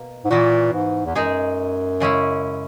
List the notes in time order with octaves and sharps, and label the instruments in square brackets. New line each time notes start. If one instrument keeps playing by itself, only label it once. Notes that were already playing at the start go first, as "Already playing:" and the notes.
Already playing: [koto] B2 A#3
[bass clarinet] G#2
[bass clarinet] A#2 [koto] E3 B3 F#4
[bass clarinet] G#2
E2
[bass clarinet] F#2 [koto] G#3 D#4 G#4
[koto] C#3 G#3 C#4 E4